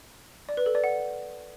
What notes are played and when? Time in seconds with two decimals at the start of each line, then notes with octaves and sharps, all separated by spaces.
0.49 D5
0.57 B4
0.66 A4
0.75 D5
0.84 F#5